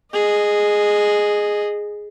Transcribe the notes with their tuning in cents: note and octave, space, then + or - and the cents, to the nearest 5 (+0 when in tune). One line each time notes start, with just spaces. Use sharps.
G#4 +0 D#5 -15